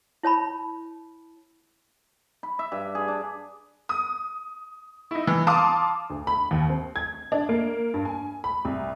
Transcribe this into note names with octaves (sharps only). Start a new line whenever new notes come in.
E4 C#5 A5 B5
B5
E5
G2
G#4
D4
D#6
D#4 E4
E3
F5 A5 C6 D6 D#6
D2
B5
D#2
C4
G#6
D4
A#3
G2
G#5
B5
C2